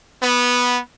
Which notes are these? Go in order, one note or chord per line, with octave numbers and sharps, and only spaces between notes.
B3